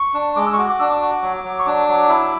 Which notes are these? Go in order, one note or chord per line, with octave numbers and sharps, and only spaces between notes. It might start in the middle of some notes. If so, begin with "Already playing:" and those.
Already playing: C#6
D4
G#3 D6
E6
C#6
F#4 D6
D6
D4 E6
D6
F#4
F#3
F#3
C#6
D4 D6
F#3
E4